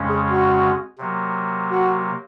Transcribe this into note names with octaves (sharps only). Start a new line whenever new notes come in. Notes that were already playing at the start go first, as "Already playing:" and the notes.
Already playing: F2 C#3 G#3 C#4
G#4
F#4
C3 F#3 A#3
F#4